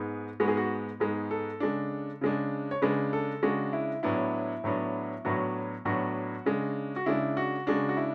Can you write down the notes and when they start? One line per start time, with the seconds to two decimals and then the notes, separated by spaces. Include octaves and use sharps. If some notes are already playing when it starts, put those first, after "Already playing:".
Already playing: G#2 G#3 B3
0.40 G#2 G#3 B3 F#4
0.48 G#4
0.57 F#4
1.00 G#2 G#3 B3
1.31 A4
1.60 C#3 G#3 D4
2.21 C#3 G#3 D4
2.71 C#5
2.82 C#3 G#3 D4 B4
3.13 A4
3.43 C#3 G#3 D4 F#4
3.73 E4
4.03 A2 F#3 B3 D4 E4
4.64 A2 F#3 B3 D4
5.25 A2 F#3 B3 D4 F#4
5.85 A2 F#3 B3 D4 F#4
6.46 C#3 G#3 D4
6.96 F#4
7.06 C#3 G#3 D4 E4
7.37 F#4
7.67 C#3 G#3 D4 F#4
7.89 F#4
7.97 E4